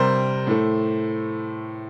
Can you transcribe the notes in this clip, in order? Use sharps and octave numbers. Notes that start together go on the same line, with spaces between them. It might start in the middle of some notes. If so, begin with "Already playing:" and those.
Already playing: C3 G3 A#4 C5
A2 A3